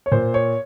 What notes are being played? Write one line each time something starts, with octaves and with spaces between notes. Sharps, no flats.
C#5
A#2 C5
C#5